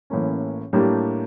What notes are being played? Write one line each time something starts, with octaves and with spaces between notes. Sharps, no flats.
A1 A2 E3 A#3 C#4
A2 G3 A#3 D4 G4